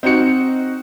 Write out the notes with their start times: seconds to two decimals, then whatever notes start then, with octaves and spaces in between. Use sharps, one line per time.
0.03 C4 D#4 F#4 C#7